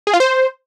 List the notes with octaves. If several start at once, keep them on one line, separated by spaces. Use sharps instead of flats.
G#4
F4
C5